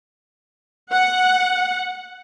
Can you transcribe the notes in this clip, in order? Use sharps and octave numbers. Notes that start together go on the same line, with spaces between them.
F#5